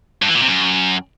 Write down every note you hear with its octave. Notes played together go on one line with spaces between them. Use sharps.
G2
E3
A#2
C3
F#2